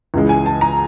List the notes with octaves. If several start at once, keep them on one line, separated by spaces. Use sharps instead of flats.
C#2 C#3 E3 G#3
G#5
A5
A#5